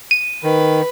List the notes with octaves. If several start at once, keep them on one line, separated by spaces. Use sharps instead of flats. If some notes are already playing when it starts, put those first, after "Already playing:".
D#7
D#3 B4